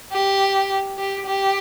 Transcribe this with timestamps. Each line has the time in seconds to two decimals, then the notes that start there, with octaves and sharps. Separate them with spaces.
0.13 G4
0.98 G4
1.26 G4